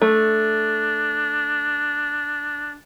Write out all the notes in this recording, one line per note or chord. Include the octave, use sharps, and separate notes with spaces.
A3 D4